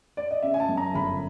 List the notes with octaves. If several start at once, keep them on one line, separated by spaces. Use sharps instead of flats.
D5
D#5
C#3 E5
G#5
A5
F#2
A#5
G1 B5